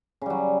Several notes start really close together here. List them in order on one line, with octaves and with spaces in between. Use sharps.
C#3 G3 F#3